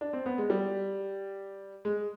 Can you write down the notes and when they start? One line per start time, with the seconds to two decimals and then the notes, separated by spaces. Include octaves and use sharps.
0.01 D4
0.13 C4
0.26 B3
0.38 G#3
0.50 G3
1.85 G#3